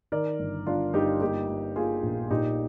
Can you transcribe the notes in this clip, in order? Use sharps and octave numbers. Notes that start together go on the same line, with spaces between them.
D#3 A#4 D5
G1
G1 D4 F4
G1 D#4 G4
A#3 D#4 G4
A#3
A#3 F4 G#4
A#1
A#2 D#4 G4